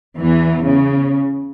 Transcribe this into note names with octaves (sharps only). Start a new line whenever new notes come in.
E2 E3
C#3